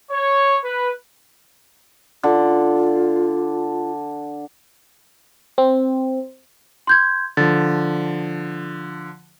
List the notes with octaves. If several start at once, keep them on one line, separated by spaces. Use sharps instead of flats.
C#5
B4
D3 F4
C4
C6 G6 G#6
D3 F3 A6